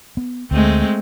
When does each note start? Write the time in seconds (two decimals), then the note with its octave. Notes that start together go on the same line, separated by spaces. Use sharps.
0.17 B3
0.51 D2 G#3 A3 C4